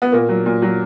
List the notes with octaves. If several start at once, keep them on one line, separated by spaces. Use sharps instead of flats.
B3
A#2 A#3
F#3
A#2
F#3